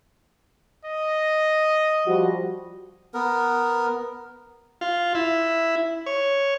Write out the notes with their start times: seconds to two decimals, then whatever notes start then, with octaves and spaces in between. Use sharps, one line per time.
0.85 D#5
2.06 F3 G3 F#4
3.14 B3 A#4
4.81 F4
5.15 E4
6.06 C#5